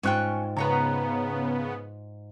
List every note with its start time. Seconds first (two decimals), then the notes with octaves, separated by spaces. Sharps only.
0.03 G#2 C#4 F4 G5 C#6 F#6
0.57 C#3 B3 B4 C#5 A#5